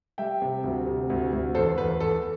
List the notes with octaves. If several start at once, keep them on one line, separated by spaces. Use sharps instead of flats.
G3 E5 G5
C3
D2
C3
D2
D2
E2 A4 C5
E2 B4
E2 A4